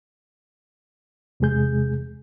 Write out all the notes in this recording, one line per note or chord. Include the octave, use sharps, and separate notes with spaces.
E2 C3 G#3 G#4 G6